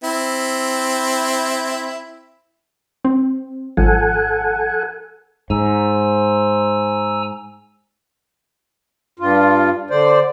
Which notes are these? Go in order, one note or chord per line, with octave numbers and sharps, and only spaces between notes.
C4 E4
C4
G#1 F3 A4 F#5 G#5
G#2 C5 G#5 A#5 E6
G2 F4
D3 C5 D5